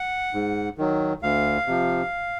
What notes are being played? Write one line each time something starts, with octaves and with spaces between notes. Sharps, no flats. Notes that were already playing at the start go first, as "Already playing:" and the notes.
Already playing: F#5
G#2
D#3 F#3
D2 F5
C3 F3